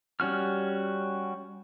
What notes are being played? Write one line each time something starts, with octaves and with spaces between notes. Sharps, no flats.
G3 C#4 F#4 F6